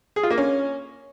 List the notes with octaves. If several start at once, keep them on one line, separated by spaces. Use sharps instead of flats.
G#4
F4
A#3
C#4